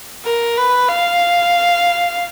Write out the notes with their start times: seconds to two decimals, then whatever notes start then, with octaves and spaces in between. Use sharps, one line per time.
0.25 A#4
0.57 B4
0.89 F5